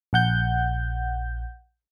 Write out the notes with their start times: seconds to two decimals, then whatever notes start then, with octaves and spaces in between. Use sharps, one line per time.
0.13 A#1 F#5 G6